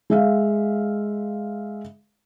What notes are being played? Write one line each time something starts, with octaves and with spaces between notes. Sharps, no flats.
G#3 E5 F5